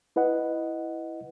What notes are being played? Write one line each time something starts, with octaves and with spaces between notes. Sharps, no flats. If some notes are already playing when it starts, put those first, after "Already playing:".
E4 B4 D#5 F#5